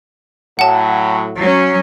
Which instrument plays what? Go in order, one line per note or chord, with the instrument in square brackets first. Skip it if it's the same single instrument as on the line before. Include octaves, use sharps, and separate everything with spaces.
[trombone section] A2 F#3 [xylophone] F#5 A5
[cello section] F#3 C#4